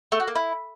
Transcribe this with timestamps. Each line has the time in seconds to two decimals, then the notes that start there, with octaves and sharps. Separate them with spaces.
0.12 A3
0.20 F#4
0.28 A#3
0.35 E4